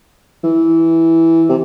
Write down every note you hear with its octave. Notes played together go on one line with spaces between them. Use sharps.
E3
C3